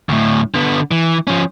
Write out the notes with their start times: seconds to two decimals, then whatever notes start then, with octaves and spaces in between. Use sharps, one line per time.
0.09 D2 A2
0.54 D3 B3
0.91 E3
1.27 F3 C#4